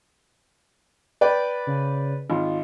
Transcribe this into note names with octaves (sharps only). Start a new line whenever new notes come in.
B4 D5 G5
C#3
G#1 F4